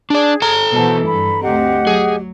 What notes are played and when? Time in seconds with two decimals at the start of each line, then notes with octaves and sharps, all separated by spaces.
0.10 D4 G#4 D5
0.42 A4 A#5
0.74 B2 E3 C5 A5
1.07 G2 B5
1.41 D2 C4 G4 D#5 F#5
1.87 F#3 G#4